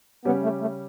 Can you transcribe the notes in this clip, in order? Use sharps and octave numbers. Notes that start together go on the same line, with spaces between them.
C#3 G3 B3 C#4 G4
A3
A3